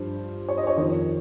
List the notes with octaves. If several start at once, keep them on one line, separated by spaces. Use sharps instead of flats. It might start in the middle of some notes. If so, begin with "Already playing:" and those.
Already playing: G2 F3 C5
C#5
D#5
C5
C#5
F2 D#3 C#5